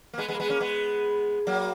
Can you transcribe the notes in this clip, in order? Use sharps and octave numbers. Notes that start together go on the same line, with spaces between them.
A#3
G#3 B3
G#3 B3
A#3
G#3 B3
A#3 C#4
G#3 B3
F#3 A#3